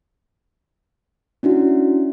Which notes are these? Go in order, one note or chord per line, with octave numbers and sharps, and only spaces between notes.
C#4 D4 E4 F#4